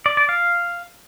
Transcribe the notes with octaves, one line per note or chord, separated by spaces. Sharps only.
D5
D5
F5